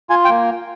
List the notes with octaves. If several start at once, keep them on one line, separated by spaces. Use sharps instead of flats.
F4 G#5
G5
A#3